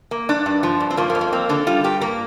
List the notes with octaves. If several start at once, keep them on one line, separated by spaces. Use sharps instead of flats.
A#3
G2 D4
G2
F3
G2
C4
F3 A#3
A#3
F2
A#3
A#3 C4
D3 D4
G3 F4
G2 G4
A#3 A#4